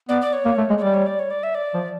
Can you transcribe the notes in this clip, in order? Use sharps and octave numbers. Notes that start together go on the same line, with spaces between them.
B3 D5
D5
C#5
A#3
A3
G#3
C#5
G3 D5
C#5
D5
C#5
D5
E5
D5
F3